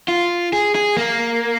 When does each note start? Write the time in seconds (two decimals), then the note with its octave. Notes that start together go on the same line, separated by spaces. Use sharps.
0.08 F4
0.53 G#4
0.75 G#4
0.97 A#3